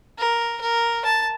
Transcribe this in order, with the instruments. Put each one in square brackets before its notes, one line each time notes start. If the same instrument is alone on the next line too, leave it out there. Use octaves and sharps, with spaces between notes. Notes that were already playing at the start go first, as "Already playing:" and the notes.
[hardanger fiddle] A#4
A#4
A5